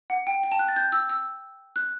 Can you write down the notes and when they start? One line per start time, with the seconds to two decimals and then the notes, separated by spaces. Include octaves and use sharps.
0.10 F#5
0.27 G5
0.43 G5
0.52 A5
0.59 F#6
0.68 A6
0.76 G6
0.92 E6
1.09 E6
1.76 F#6